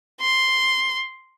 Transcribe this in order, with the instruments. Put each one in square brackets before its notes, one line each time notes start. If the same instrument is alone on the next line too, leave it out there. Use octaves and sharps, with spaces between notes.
[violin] C6